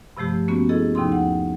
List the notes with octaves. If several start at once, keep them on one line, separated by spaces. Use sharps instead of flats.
G2 C3 F3 A3 G4
A#3 B3 C#4 F#4
E4 G#4 A4 D#5
D#2 C3 F3 D#4 C6
F#5